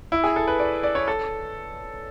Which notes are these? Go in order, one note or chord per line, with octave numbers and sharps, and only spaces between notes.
E4
G#4
A4
B4
D5
D5
C#5
A4